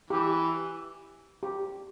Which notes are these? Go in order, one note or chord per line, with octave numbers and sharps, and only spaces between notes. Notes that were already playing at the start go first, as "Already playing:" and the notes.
E3 G4
G4